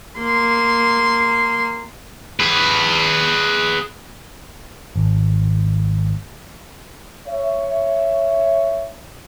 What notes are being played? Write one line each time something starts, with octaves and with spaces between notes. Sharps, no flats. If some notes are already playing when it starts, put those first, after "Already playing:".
A#3 C6
G#4 B4
G#1
C#5 E5